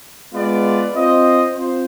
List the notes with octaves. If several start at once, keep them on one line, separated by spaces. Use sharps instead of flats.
G#3 B3 F4 B4 D5
C4 F4 C5 D#5
C4 F4 C5